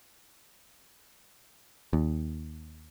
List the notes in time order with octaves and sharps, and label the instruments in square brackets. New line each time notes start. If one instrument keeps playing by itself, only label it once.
[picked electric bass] D#2